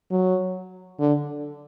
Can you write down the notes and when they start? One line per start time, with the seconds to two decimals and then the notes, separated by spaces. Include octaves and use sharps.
0.11 F#3
0.99 D3